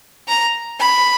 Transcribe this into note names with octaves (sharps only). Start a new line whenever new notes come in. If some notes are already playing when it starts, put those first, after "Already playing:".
A#5
B5